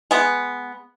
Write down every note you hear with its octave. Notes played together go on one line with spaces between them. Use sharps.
G#3 B3